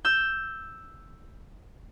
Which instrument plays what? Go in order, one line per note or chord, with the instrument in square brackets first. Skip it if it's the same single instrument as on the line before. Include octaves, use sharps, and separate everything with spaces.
[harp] E6 G6